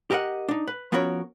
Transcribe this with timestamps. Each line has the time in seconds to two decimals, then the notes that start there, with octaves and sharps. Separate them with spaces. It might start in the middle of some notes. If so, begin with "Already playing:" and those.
0.11 G4 A#4 D#5 F#5
0.48 D4 D#4
0.68 B4
0.92 F3 B3 C#4 F#4 A#4 C#5